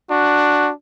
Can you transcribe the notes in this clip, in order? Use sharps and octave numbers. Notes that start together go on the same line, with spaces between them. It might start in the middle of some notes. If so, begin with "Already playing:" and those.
D4 F#4